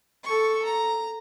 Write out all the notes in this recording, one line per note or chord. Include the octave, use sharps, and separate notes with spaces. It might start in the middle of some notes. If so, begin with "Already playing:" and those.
A4 C#6
A#5